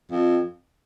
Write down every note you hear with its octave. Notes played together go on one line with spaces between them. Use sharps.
F2